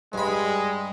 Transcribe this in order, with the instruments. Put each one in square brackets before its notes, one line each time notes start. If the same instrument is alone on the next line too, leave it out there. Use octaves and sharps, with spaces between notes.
[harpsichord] G2 B5 [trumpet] G#3